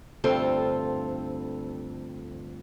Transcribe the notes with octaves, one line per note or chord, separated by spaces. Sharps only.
D2 G2 C4 F4 A4